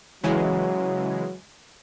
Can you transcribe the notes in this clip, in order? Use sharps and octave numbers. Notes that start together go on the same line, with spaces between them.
C#3 E3 F#3 G#3